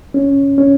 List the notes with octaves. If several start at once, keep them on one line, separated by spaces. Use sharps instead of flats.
C#4
C#4